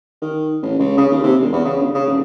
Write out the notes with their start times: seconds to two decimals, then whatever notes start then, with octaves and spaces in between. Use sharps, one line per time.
0.22 D#3
0.62 A1
0.79 C#2
0.97 C#3
1.12 D#2
1.23 C3
1.40 E1
1.53 E2
1.65 C#3
1.79 G1
1.94 C#3
2.06 D#1